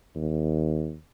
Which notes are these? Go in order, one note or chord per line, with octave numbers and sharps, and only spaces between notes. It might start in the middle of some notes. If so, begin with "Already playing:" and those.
D#2